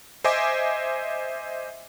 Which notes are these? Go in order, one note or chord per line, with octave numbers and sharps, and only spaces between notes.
C5 D#5 E5 G#5 D6